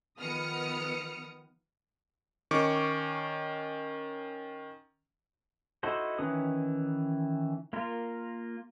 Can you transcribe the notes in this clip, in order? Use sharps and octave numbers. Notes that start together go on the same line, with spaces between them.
D#3 F3 B3 D#6 F6 C#7
D#3 C#4 C#6 D6
D#4 E4 F#4 A4 C5
D#3 E3 C#4 B4 D#6
A#3 F4 A#4